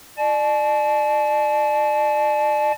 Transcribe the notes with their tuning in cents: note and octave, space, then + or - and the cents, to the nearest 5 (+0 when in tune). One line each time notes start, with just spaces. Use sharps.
D5 +40 A5 -35